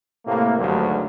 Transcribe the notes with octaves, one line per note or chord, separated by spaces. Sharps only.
A2 C3 A#3
G#1 D2 G2 F#3